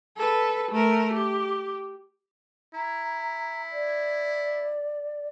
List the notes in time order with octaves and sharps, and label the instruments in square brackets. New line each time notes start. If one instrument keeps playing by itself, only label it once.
[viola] A4 B4
A3 A#4
G4
[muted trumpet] E4 [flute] A#5
[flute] D5